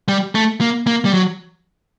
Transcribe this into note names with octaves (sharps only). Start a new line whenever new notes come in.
G3
A3
A#3
A#3
G3
F#3